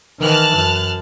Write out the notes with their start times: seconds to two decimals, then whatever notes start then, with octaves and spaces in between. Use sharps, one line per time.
0.20 D#3 E3 A5 F6 F#6
0.55 F#2